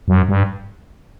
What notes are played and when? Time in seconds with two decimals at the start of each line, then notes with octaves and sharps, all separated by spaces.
0.08 F#2
0.29 G2